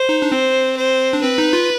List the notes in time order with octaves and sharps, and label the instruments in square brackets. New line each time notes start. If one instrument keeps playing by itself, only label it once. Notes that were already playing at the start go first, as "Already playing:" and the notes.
Already playing: [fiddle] C5
[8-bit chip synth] D#4
D4
[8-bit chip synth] C4 [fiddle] C5
[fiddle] C5
[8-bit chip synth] D4
[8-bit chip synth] C4 [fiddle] B4
[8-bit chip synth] D#4
F4